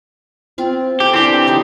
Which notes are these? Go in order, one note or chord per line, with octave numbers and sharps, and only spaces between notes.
C4 F4
A3 G4
E3 C4 D4 G4
F#3 D#4 G4